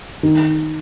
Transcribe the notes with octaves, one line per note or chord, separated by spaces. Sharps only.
D#3